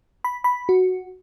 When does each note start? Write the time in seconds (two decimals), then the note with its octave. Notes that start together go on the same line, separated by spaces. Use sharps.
0.24 B5
0.44 B5
0.69 F#4